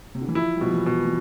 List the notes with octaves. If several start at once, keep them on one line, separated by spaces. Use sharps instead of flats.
C3
D3
E3
F3 E4
G3
B2 F3
E3
B2
E3